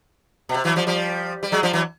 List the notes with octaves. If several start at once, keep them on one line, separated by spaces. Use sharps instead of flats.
B2
C3
E3 F#3
F3 G3
F3 G3
G3
F#3 G#3
F3 G3
E3 F#3